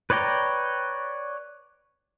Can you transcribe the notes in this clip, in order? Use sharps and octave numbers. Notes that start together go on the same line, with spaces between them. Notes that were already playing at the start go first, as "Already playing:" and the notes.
B4 C#5 D5 G5 A#5